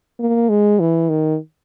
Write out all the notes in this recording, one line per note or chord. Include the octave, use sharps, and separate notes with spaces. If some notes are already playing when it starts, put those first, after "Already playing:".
A#3
G#3
E3
D#3